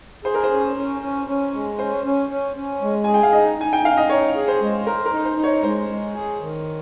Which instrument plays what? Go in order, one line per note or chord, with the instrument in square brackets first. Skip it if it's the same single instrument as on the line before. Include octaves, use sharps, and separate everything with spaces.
[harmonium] G#4 [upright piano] C5
[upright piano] A#4
C5
[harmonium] C#4
C#4
C#4
C#4
G#3
[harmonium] C#4 [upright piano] C5
[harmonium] C#4
C#4
C#4
G#3
[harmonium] G#4 [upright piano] G#5
[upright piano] G5
F5
[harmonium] D#4 [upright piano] D#5
[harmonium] D#4 [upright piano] G#5
[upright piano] G5
[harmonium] D#4 [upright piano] F5
[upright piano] D#5
[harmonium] D#4 [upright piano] C#5
[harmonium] G#4
[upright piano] C5
[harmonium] G#3
[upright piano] A#4 [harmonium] C5
[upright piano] A#4
[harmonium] D#4
[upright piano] C5
[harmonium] D#4
[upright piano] C#5
[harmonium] G#3 [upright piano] C5
[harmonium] G#3
G#4
D#3